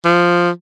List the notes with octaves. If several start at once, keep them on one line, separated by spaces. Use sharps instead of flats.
F3